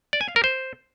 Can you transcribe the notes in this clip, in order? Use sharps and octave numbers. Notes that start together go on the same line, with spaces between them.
D5
G#5
F5
A#4
C5